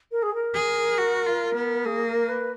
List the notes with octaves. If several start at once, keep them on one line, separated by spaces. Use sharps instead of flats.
A#4
G#4
A#4
G#4
F#4
F4
B3
A#3 G#4
A#4
B4